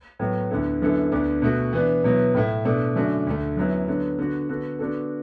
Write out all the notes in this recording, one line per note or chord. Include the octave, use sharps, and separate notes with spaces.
A2 F#3 B3
D2 D3 B3 E4 A4
F#2 D3 B3 E4 A4
D2 D3 B3 D4
B2 A3 F#4
E3 B3 D4
B2 F#3 B3 E4
A2 A3 E4
B2 A3 D4 A4
F#2 D3 A3 D4 F#4
D2 D3 A3
F#2 F#3 B3 E4
D3 F#3 B3
D3 B3 F#4
D3 B3 F#4 A4
D3 B3 D4 F#4 A4